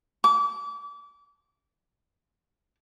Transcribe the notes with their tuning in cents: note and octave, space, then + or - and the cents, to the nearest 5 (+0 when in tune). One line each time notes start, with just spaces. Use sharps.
D6 -30